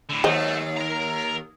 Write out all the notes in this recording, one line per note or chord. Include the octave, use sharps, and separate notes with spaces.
A2 D3
D#2 F#3 A3 C5 D#5
A#4 A#5